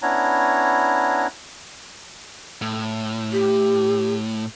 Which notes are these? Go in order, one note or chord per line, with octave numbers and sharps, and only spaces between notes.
B3 C#4 D4 E4 C#5 A#5
A2
G4